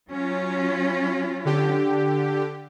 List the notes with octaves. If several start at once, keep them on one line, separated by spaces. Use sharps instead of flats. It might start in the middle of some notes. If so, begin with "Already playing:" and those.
F#3 C#4 F4
D3 G4